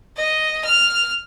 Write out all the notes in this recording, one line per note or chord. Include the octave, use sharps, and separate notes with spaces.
D#5
F6